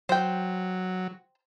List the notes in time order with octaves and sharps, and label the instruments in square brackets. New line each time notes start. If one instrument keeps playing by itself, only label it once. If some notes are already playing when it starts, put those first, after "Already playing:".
[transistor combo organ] F#3 [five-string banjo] C5 G5